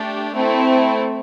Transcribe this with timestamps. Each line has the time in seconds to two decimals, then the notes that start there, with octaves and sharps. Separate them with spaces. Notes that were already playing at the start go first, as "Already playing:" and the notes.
Already playing: A3 D4 G4
0.33 A3 C4 E4